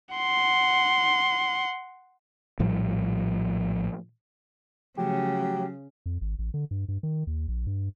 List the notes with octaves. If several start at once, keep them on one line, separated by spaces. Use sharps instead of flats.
F#5 C6
A#1 A2 F3 G3
C#3 F3 F#3 A3 G4
F2
G#1
A1
D3
G2
G2
D#3
D#2
A#1
G2